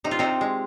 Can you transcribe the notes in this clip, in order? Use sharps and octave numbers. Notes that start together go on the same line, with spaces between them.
C3 D#4
F4
C3 C4 D#4
G#3